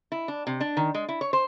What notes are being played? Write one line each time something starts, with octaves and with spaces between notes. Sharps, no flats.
E4
D4
C3
D4
D#3
G#3
E4
C#5
C5